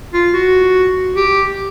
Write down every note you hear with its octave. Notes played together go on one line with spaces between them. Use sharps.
F4
F#4
G4